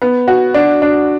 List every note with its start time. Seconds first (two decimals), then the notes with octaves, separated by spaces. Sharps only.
0.02 B3
0.28 F#4
0.54 D4
0.82 D4